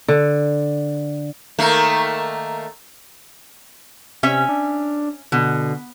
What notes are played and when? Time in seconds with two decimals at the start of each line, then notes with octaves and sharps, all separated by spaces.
0.08 D3
1.59 D#3 A3 A#3
4.23 C3 C#4 E5
4.49 D4
5.32 B2 D3